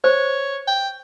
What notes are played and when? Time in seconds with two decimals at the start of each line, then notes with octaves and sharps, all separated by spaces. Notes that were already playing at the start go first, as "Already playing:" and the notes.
0.04 C5 C#5
0.67 G5